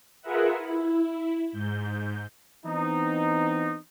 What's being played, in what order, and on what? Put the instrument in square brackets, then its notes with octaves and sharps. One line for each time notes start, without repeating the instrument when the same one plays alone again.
[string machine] F4 G#4 A#4 B4 E5 F#5
E4
G#2 G6
[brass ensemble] E3 B3 C4 D#4